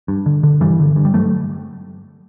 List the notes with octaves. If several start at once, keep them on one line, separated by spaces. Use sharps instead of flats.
G2
D3
D3
G2 E3 G3
D3
G2
G3
G2 F#3 A3